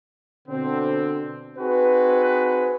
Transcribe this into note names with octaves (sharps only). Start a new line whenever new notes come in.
B2 D3 C4
C4 D#4 F#4 G#4 B4